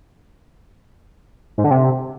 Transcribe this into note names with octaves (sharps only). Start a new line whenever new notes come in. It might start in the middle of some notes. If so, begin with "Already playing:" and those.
G#2
D3
C3